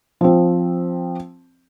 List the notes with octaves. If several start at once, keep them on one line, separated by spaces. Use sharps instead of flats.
F3 C4